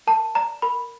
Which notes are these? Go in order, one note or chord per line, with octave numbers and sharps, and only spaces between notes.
A#4 A5
D5 A#5
A#4 B5